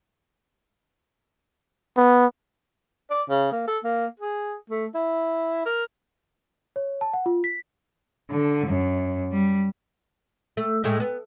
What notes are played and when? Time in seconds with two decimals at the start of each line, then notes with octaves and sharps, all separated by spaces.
1.97 B3
3.10 D5
3.29 C#3
3.52 A#3
3.67 A4
3.84 A#3
4.20 G#4
4.70 A3
4.95 E4
5.66 A#4
6.76 C#5
7.01 A5
7.13 F#5
7.26 F4
7.44 B6
8.31 D3
8.67 F#2
9.32 G3
10.57 A3
10.84 A2 G#3 A3
11.00 B3